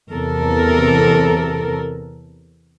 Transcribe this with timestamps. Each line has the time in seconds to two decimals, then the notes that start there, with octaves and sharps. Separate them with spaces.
0.13 E2 C3 A4 A#4